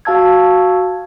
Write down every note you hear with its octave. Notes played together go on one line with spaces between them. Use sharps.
F#4 F5 A5 E6 G#6